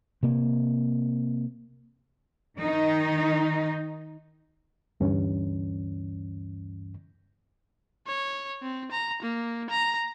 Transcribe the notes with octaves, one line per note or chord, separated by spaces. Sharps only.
C3 A#3
D#3 D#4
D2 G2 E3 C#4
C#5
C4
A#5
A#3
A#5